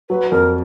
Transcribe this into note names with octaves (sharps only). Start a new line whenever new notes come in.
F#3 B4
F2 A#4